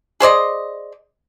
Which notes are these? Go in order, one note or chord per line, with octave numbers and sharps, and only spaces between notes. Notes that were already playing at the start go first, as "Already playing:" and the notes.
G#4 C5 D5 D#5